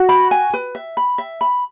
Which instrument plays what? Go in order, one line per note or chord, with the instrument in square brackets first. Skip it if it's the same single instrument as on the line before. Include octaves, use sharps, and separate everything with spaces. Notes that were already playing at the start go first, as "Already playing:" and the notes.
Already playing: [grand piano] F#4
[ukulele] B5
G#5
B4
E5
B5
E5
B5